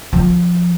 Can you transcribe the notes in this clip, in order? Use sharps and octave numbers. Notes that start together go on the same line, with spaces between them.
F3